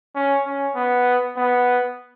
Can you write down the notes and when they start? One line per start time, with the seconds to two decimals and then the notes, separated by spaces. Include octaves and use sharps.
0.15 C#4
0.46 C#4
0.76 B3
1.37 B3